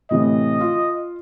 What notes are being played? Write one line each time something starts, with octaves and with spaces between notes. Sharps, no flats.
A2 C3 E3 D#5
F4